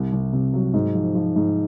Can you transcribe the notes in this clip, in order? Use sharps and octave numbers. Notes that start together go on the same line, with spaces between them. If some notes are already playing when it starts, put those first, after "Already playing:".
Already playing: C2
C2
C3
F#3
G#2
F3
F3
G#2